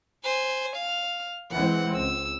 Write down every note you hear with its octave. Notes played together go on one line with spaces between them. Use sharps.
C5 G#5
F5 F6
E3 G#3 C4 F#5
C#2 E6